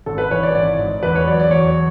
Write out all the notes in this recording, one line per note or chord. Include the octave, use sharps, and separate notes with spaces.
G#1 A4
B4
E3 C#5
D5
G#1 D5
G#2
E2 B4
C#5
F#3 D5
D5
E2 C#5